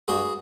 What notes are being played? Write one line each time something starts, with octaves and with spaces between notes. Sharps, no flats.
G2 F#4 G#4